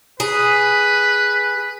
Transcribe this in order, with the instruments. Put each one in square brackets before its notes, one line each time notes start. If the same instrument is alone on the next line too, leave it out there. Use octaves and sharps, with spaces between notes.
[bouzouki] G#4 [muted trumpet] B4